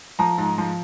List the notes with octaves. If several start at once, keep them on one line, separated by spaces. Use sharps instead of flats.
F3 A#5
G#2
F3